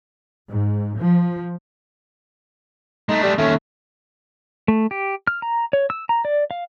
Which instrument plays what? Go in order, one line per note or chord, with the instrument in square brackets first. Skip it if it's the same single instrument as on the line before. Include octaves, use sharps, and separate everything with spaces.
[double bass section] G#2
F3
[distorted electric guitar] G#3 A3 [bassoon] D#4
[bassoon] G3
[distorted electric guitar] D#2 C#4 [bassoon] A3
[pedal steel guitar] A3
G4
F6
A#5
C#5
E6
A#5
D5
F5